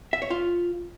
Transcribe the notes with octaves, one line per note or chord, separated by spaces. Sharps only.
E5
C#5
F4